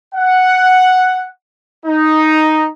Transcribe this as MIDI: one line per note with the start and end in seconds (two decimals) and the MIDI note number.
0.15 1.28 78
1.86 2.69 63